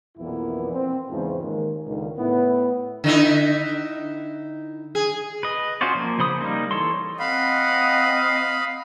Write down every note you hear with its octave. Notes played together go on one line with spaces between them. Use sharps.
B1 F2 A#2 E3 B3 E4
C4
E2 G#2 C#3 F3
D#2 G#3 A#3
C#2 A#2 D3 D#3
A2 B3 E4
D3 D#4 E4
G#4
B4 D#5
C#4 F4 F#4 C5 D5
F3 A#3
C#3 C5 B5 D#6
G3 A#3 D#4
E3 A4 C#5 C6
C4 D#5 F5 F#5 B5